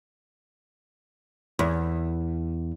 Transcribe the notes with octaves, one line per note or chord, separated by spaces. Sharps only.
E2